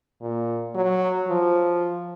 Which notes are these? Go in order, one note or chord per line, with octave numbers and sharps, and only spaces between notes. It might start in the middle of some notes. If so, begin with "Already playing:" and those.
A#2
F#3
F3